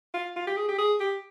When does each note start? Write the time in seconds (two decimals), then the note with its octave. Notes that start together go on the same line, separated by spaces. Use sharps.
0.14 F4
0.36 F4
0.47 G4
0.57 G#4
0.68 G4
0.78 G#4
1.00 G4